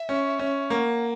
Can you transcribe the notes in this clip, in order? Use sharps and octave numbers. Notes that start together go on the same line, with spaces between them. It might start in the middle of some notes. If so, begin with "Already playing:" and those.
Already playing: E5
C#4
C#4
A#3 F#5